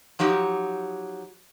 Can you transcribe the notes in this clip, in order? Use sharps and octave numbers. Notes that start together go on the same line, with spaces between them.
F3 F#3 D#4 G4